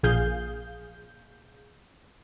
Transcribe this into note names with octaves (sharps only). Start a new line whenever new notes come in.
A#1 A#2 G#4 F5 G6